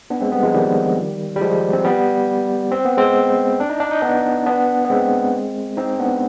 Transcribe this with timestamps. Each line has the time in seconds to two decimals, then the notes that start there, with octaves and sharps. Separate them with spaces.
0.10 B3 D4
0.21 G#3 C4
0.32 G3 B3
0.43 F3 G#3
0.54 D#3 G3
1.36 G3
1.41 F3 G#3
1.73 C4
1.84 G3 B3
2.71 C4
2.85 B3
2.97 G#3 C4
3.60 D4
3.70 D#4
3.80 D4
3.91 D#4
4.02 B3 D4
4.46 B3 D4
4.85 B3
4.90 G#3 C4
5.77 C4 D#4
5.99 B3 D4